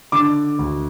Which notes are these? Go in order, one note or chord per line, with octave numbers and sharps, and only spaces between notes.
D3 D6
D2